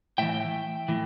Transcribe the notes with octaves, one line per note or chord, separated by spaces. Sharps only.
A2 E3 E5 G5
A2 E3